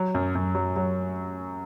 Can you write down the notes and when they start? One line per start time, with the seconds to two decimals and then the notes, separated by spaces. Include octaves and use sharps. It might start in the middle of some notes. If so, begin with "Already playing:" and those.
Already playing: F#3
0.15 F#2
0.35 F#2
0.55 F#3
0.76 F#3